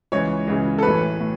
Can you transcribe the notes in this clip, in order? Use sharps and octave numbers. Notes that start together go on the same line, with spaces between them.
C#2 C#3 E3 C#5
C#2 C#3 E3
A4
A1 A2 E3 B4
A2